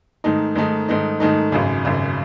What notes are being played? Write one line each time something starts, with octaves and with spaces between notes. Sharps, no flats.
G#2 D#3 A3 D#4
G#2 D#3 A3 D#4
G#2 D#3 A3 D#4
G#2 D#3 A3 D#4
G#1 F#2 C#3
G#1 F#2 C#3